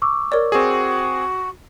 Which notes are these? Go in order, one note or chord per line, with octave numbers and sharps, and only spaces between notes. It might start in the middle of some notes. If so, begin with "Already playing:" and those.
C#6 D6 E6
A#4 C#5 D5
C4 F#4 G#4